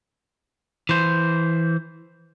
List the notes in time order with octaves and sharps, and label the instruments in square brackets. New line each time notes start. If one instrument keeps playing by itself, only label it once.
[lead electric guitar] E3 C5